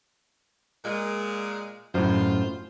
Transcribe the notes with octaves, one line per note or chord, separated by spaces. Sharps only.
A#2 G#3
F#2 A2 F4 C5